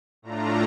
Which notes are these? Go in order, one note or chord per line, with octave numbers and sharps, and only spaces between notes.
A2 A3 D4 F4 A#5